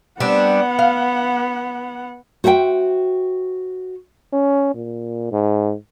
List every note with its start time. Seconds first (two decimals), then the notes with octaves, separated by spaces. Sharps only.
0.20 G3 B3 C4 D4 F#5
0.79 F5
2.44 F#4 C5 E5 F#5 G5
4.33 C#4
4.75 A#2
5.32 G#2